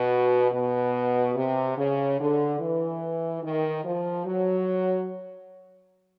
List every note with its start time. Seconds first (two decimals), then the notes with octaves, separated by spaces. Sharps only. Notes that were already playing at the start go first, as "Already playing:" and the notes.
Already playing: B2
0.51 B2
1.34 C3
1.76 C#3
2.17 D3
2.59 E3
3.42 D#3
3.83 F3
4.25 F#3